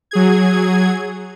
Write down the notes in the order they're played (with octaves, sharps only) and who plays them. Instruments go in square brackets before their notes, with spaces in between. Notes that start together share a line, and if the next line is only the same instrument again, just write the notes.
[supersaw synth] F#3 G#4 G#6